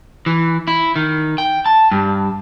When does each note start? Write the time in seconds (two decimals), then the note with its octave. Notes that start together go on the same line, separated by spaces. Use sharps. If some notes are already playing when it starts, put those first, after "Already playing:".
0.26 E3
0.68 E4
0.96 D#3
1.38 G5
1.66 A5
1.91 G2